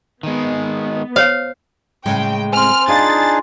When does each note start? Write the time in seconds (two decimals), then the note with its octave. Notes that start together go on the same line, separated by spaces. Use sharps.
0.23 D#3 G#3 B3
1.16 C5 C#5 F5
2.06 A2 C#3 G#3 G5
2.53 C4 G#5 C6 F6
2.88 D4 D#4 F4 G#4 A6